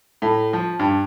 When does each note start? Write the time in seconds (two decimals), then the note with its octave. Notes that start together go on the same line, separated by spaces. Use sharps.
0.22 A2
0.53 F3
0.79 G2